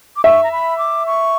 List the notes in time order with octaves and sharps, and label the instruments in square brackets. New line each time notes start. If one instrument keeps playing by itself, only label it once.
[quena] D6
[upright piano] E5 [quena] C#6
[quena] A#5
B5
D6
C#6